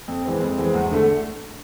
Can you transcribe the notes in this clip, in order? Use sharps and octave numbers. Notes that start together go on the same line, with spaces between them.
F2
E3 G#3 C4
F2
E3 G#3 C4
E2
D3 A3